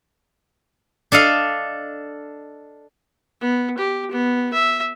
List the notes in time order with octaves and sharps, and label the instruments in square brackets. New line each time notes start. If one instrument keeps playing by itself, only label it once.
[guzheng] D4 A4 D#5 F5
[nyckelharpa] B3
G4
B3
E5